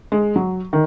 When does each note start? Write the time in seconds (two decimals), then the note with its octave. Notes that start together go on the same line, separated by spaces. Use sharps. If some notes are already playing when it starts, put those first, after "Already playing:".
0.12 G#3
0.36 F#3
0.73 D#3